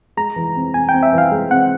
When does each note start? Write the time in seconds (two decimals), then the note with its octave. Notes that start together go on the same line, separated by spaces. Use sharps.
0.17 G#3 A#5
0.36 E3
0.56 C4
0.74 C4 G#5
0.89 C4 G5
1.03 E5
1.12 E3
1.18 F5
1.32 G#3
1.51 C4 F#5